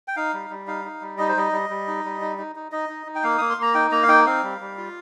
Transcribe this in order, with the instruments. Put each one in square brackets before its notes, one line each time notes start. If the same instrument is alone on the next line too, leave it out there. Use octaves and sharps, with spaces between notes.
[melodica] G5
D#4 F5
G3
G3
D#4 F5
D#4
G3
D#4 D#5
C5
G3 D#5
G3
G3
D#4
G3
D#4
D#4
D#4
D#4 D#5
D#4
D#4
G5
A#3 F5
A#3 D#6
C6
A#3 A#5
D#4 G5
A#3 A#5
F5
D#4 G5
C4 F5
G3
G3
F4